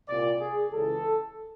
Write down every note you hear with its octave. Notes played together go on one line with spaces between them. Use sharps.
C2 A#2 D5
G#4
C#2 C#3 E3 A4